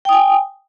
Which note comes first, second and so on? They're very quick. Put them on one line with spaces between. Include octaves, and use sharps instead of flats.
G5 D#6 G#5